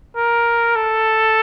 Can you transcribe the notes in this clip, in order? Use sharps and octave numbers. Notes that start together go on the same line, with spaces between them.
A#4
A4